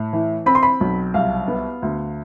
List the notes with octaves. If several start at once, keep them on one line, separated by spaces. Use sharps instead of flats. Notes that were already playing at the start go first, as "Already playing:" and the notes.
Already playing: A2
E3
C4 B5
C6
B5
B1
C2 F5
B3
D2